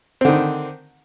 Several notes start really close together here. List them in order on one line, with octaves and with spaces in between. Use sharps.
C4 D3 D#3